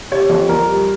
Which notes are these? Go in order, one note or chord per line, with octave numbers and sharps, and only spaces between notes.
C3 C#5
F2
F2 A#4
G3